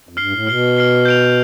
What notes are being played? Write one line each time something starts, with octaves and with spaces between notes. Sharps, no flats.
F2
G2 F6 C7 G7
A2
B2 F6 C7 G7
F6 C7 G7
G6 D7 F7